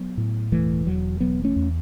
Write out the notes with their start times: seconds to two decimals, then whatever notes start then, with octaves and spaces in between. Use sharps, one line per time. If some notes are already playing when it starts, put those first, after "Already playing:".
Already playing: F#3 B3
0.18 A2
0.52 E1 E3 A3
0.86 E2 F#3
1.20 E1 F#3 B3
1.44 A3 C#4
1.56 E2